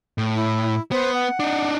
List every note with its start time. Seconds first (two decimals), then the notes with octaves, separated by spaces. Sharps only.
0.18 A2
0.35 E4
0.92 B3 C5
1.14 F#5
1.40 D4 D#4